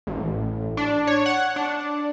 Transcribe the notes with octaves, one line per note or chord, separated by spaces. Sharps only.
A1
D4
C#5
F#5
D4